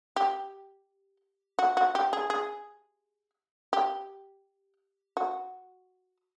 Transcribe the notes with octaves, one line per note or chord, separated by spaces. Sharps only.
G4
F#4
F#4
G4
G#4
G#4
G4
F#4